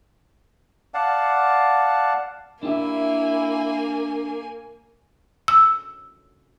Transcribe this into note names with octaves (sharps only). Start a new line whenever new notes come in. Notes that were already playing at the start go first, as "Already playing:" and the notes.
D5 F5 F#5 A5
A#3 D4 E4 G4 E5 G#5
E6